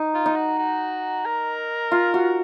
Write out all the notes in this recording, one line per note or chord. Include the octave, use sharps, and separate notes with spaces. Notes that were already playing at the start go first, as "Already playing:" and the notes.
Already playing: D#4
F4
D#4
F#4
F#4
A#4
F4
F#4